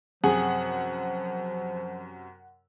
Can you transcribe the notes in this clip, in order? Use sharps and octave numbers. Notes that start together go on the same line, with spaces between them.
F#2 C3 F3 G#4 F#5